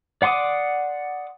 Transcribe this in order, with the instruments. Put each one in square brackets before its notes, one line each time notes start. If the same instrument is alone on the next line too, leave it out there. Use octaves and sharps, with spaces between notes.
[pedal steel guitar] D5 F#5 C6 D6 D#6